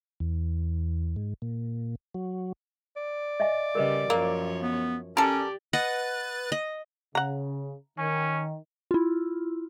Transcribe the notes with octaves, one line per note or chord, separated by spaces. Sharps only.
E2
G#2
A#2
F#3
D5
D#5 E5 G#5
C#3 G3 A#4 B4 D#5
F#2 F3 A#3 A#4 C#5
B3
C#4 G4 A4 A#4 D5
B4 D#5 F#5 F#6 A6
D#5
C#3 F#5 A#5
D#3 C#4
E4 F4